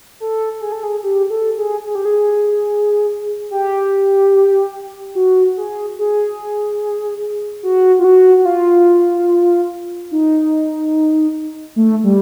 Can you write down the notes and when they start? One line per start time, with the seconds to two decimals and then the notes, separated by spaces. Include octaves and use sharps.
0.20 A4
0.61 G#4
0.72 A4
0.83 G#4
1.03 G4
1.30 A4
1.57 G#4
1.85 G#4
1.95 G4
2.05 G#4
3.51 G4
5.15 F#4
5.57 G#4
5.99 G#4
7.63 F#4
7.99 F4
8.04 F#4
8.37 F#4
8.45 F4
10.11 D#4
11.76 A3
12.04 G3